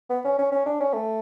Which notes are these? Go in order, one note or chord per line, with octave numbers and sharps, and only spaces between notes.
B3
C#4
C#4
C#4
D4
C#4
A3